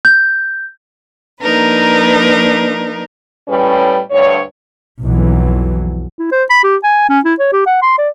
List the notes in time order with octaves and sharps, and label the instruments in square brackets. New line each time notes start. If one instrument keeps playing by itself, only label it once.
[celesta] G6
[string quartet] F3 A#3 D4 D#4 A#4 B4
[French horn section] A2 G3 C#4 B4
D2 G2 C#5
[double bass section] B1 F2 E3 F#3
[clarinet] E4
C5
B5
G4
G#5
C#4
E4
C#5
G4
F#5
C6
D5